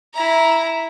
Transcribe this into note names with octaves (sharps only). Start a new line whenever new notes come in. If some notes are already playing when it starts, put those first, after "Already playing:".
E4 A#5